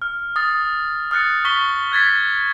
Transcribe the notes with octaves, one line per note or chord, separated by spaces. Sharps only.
F6
D#6 A6
D#6 F6 F#6 A6 C#7
C#6 B6 G7
F#6 G#6 A6 B6